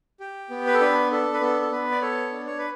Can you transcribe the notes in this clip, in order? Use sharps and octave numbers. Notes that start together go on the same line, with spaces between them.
G4
B3
B4
A4
D4 B4
D4 A4
B4
B3 A4
A4
B3 B4
D5
A4 C#5
D4
C#5
B4